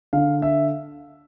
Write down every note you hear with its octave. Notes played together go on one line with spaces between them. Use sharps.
D3 F5
E5